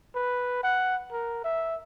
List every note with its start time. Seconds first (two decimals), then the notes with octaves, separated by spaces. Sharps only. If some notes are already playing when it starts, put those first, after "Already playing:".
0.15 B4
0.63 F#5
1.12 A#4
1.44 E5